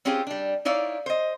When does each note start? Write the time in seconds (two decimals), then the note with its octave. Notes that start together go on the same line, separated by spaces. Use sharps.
0.05 C4 C#4 F4 G4 G#4
0.27 G3 D4
0.65 D#4 E4 C#5 D5 F5
1.06 C5 D#5